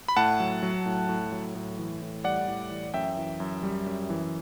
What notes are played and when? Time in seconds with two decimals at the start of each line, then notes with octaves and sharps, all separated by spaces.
0.08 B5
0.17 A2 F#5 A5
0.40 F#3
0.63 F#3
0.86 A2
1.09 A2
1.32 F#3
1.55 A2
1.78 E3
2.02 A2
2.24 G3 D5 F#5
2.48 A2
2.71 E3
2.94 F#2 E5 G5
3.17 E3
3.40 F#2
3.63 G3
3.86 F#2
4.10 E3